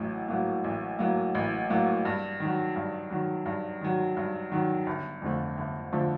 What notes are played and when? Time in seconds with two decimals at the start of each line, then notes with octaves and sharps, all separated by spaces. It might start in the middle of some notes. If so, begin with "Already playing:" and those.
Already playing: A1 A2 F#3
0.28 A2 F#3 A#3
0.64 A1
0.99 A2 F#3 A#3
1.35 A1
1.70 A2 F#3 A#3
2.05 G2
2.40 D#3 F#3
2.76 G2
3.10 D#3 F#3
3.46 G2
3.81 D#3 F#3
4.17 G2
4.52 D#3 F#3
4.87 G1
5.22 F2 D3 F3 A3
5.57 G1
5.92 D3 F3 A3